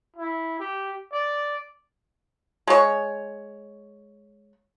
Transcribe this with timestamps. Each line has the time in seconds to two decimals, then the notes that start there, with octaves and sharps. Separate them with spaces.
0.16 E4
0.59 G4
1.12 D5
2.67 G#3 C#5